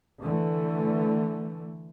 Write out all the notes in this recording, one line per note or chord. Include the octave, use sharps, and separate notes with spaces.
D3 E3 A3